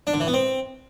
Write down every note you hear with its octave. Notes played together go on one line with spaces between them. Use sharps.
D4
D3
E3
B3
C4